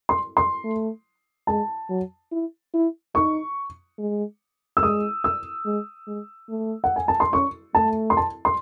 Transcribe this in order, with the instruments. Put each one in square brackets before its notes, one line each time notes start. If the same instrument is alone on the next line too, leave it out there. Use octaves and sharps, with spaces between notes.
[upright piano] C6
C6
[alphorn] A3
[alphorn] G#3 [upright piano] A5
[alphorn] F#3
E4
E4
[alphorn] D#4 [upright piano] C#6
[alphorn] G#3
[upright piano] E6
[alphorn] G#3 [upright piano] D#6
[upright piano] E6
[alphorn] G#3
G#3
A3
[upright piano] F#5
G#5
A5
C6
[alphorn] C#4 [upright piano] C#6
[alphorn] A3 [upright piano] A5
[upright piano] C6
A5
C6